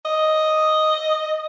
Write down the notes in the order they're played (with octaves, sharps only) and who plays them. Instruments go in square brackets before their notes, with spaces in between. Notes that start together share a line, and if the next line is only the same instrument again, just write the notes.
[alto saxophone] D#5